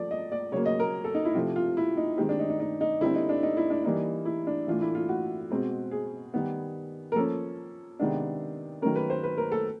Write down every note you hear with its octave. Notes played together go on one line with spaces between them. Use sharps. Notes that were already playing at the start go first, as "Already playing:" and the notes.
Already playing: F3 A3 D5
D#5
D5
C#3 F#3 A#3 C#5
D#5
A#4
A4
D#4
E4
C3 F3 A3 F4
F4
E4
D#4
D#3 G#3 C4 G4
D4
D#4
D#4
D#4
D#4
D3 G3 C4 E4
D#4
D4
D#4
E4
D4
E3 G3 A#3 D4 D#4
E4
D4
A2 E3 A3 D4 F4
E4
F4
F#4
B2 G#3 C4
G#4
D#3 G3 B3
A#4
F3 A#3 C#4 A4
C3 D#3 G#3 B3 D4
D#3 F#3 A3 C#4 A#4
B4
C5
B4
A#4
A4